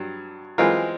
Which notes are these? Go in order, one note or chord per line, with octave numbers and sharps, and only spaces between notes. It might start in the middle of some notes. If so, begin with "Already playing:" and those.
Already playing: G2 F#3
E3 G#3 C4 F4 A#4